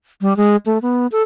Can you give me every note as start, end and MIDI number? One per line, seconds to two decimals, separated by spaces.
0.21 0.36 55
0.37 0.56 56
0.66 0.78 57
0.82 1.07 59
1.12 1.22 69